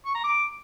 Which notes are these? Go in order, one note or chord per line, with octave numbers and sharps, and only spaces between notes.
C#6
A#5
D6